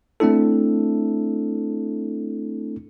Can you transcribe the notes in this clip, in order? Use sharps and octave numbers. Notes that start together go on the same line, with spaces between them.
A3 C4 D4 E4 A4